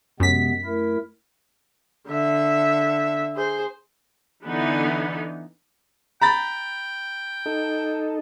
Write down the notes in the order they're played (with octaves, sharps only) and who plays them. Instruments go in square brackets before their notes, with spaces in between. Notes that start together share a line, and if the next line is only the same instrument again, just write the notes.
[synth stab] F#2 B6 [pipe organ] C3 G#3 B3
[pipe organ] A3 E4 A#4
[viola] D3 E5
G#4 C5
[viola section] D3 E3 B3 D#4
[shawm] G5 [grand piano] A#5 B5 A6
[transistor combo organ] D#4 A4